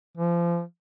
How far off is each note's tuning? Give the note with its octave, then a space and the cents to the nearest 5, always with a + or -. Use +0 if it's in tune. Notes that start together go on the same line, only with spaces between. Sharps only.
F3 -30